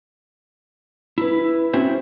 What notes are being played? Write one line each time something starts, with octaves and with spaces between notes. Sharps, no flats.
E4 B4
C4 C#4 E4 F#4 C5